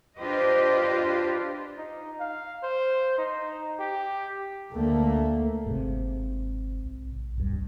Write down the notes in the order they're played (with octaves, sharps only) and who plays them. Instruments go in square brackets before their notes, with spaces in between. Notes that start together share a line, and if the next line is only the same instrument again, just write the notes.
[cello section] D4 F4 G4 B4 C5 D#5
[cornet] D#4
F5
C5
D#4
G4
[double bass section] D2 A3 A#3
[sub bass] G1 [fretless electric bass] G#2 C3
[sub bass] A#1
[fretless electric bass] D1 G2 [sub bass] A#1